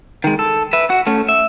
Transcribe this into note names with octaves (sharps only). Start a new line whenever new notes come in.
D#3 G#3
A4
B4 E5
F#4
A3 C#4
E5